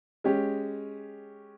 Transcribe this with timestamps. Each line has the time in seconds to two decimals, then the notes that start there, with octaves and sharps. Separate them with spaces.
0.24 G#3 C#4 G4